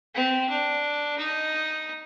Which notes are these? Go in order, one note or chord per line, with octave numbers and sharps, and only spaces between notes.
C4
D4
D#4